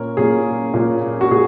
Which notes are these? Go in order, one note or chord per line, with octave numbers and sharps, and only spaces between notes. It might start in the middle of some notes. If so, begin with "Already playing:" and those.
Already playing: A#2 A#3 C#4 A#4
A#2 A#3 C#4 G#4
A#2 A#3 C#4
F#4
A#2 G#4